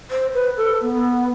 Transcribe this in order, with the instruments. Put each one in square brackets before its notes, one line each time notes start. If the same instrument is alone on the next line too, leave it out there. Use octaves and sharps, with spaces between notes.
[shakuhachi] C5
B4
A4
B3